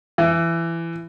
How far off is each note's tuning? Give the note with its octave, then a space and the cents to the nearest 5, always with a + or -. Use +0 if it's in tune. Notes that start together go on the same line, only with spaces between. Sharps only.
E3 +20